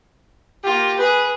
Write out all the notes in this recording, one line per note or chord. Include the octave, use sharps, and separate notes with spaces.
A#3 F4 G4
G#4 B4